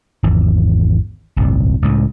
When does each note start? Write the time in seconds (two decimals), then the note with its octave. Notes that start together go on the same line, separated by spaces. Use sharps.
0.23 G#1 E2
1.36 D1 G1 C2
1.82 C#2 A2